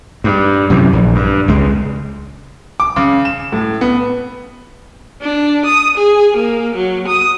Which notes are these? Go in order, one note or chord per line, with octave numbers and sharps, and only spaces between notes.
G2
F#2 C3 E3
A#1
G2
C#2 G#3
D6
C#3
E7
A2
B3
D4
D#6
G#4
A#3
F#3
D#6